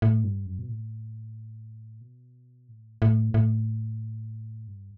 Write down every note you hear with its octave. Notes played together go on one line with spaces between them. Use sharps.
A2
G2
F#2
B2
A2
B2
A2
A2
A2
G2